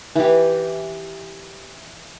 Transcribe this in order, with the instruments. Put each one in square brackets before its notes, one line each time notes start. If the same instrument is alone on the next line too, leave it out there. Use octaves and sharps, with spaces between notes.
[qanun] E3 G4